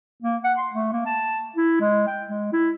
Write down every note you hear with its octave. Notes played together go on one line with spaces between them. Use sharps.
A#3
F#5
C6
A3
A#3
A5
E4
G#3
G5
G#3
E4